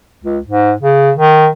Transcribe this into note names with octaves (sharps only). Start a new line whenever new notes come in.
C#2
G#2
C#3
D#3